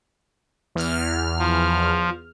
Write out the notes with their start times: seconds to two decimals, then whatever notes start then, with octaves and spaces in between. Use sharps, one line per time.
0.75 E2 F6
1.39 F3